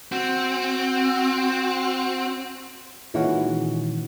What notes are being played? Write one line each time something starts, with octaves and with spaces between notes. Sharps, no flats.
C4 F#4
A#2 D#3 E3 G#3 C#4 F#4